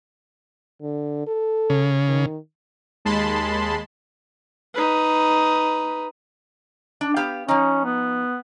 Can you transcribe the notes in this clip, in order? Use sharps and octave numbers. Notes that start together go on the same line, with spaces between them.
D3
A4
C#3
D#3
D#2 G#3 A5 B5 C6
D#4 B4
D4
B3 G4 F5
F3 C#4 D#4
B3